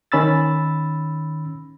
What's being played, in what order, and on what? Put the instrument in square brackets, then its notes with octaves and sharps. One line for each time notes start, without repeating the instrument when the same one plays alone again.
[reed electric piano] D#3 C#4 B5 E6 A6